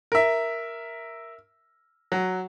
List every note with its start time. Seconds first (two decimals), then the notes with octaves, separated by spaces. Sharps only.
0.12 A#4 E5
2.12 F#3